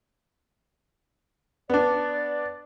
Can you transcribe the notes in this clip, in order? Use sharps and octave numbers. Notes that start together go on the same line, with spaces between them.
B3 D4 D5